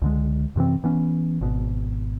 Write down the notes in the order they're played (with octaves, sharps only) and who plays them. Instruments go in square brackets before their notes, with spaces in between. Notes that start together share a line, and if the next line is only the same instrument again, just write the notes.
[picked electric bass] C#2 D3 G#3
F#2 C3 E3 C4
E3 B3 C#4
G#1 B2